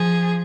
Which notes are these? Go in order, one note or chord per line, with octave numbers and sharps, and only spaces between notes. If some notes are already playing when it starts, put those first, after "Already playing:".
Already playing: F3 G#4